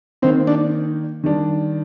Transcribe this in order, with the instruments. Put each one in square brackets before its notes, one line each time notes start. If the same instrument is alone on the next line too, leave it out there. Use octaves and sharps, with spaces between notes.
[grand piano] D#3 A#3 D#4 [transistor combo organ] C4
[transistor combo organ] D4
[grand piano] D#3 G3 D4